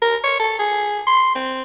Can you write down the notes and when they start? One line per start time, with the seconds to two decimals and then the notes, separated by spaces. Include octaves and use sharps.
0.02 A#4
0.24 C#5
0.40 A4
0.59 G#4
1.07 C6
1.35 C4